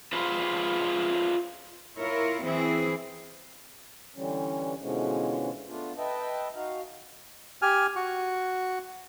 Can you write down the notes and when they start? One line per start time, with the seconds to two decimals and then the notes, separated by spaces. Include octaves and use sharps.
0.13 F4 G#4 B4 C5
1.99 E4 F4 A#4 C#5
2.44 E3 C4 E4 G#4
4.16 D3 E3 G3 C#4
4.81 B2 D3 E3 F3 G#3 C#4
5.68 A3 B3 D4 F4
5.98 B4 D#5 E5 G5 A5
6.55 D#4 F#4 F5
7.62 G4 G#5 F6
7.96 F#4 C#6